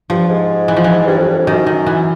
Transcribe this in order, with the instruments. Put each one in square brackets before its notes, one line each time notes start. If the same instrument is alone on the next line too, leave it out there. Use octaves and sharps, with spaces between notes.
[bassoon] G2 [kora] F3
[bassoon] G#2
[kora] E3
F3
E3
[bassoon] G2
F2
G2
F2
[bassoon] F#2 [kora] D#3
[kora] D#3
E3